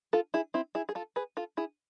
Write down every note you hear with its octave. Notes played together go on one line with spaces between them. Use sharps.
F4 A4
E4 G#4
C4 E4
E4 G#4
G#4
F4 A4
G#4 B4
F4 A4
E4 G#4